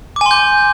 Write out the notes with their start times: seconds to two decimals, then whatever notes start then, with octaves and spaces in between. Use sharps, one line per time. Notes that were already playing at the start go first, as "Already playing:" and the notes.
0.16 D6
0.21 G#5
0.26 C6
0.31 G6